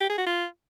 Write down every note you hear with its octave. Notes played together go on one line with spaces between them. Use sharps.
G4
G#4
F#4
F4